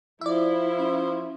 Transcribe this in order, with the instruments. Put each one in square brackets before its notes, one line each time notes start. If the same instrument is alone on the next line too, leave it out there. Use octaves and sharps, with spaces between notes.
[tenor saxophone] F3 [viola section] E4 [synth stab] D5 E5
[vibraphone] C#4 C6